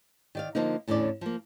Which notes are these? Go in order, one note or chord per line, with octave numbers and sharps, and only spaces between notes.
D#3 D5 F5
D3 F3 A#3 D#4
E2 A2 D3 C#4 D5
F3 A#3